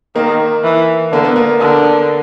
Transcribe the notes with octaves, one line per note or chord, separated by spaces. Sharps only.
D#3 A#3
E3
D3 A#3
B3
A#3
D3